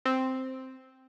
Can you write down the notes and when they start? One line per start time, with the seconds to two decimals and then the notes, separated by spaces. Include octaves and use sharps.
0.05 C4